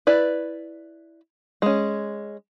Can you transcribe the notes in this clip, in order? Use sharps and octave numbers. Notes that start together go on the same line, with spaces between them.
E4 B4 D5
G#3 C#4